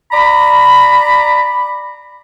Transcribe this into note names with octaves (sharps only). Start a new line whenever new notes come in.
D5 A#5 B5